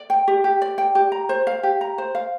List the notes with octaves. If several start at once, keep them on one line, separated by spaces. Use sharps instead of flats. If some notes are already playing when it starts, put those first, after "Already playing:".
Already playing: D5
G5
G4
G4
D5
G5
G4
A#5
C5
F5
G4
A#5
C5
F5